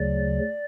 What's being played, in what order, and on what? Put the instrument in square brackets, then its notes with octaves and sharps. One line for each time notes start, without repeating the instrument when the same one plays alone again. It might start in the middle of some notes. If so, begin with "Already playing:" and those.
Already playing: [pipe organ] D2 C#3 F#3 D5